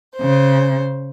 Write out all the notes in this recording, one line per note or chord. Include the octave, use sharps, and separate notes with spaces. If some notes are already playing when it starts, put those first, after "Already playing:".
C#3 C5